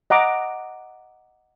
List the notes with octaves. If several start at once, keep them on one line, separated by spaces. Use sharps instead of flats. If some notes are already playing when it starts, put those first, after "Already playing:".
D#5 F#5 A#5 D6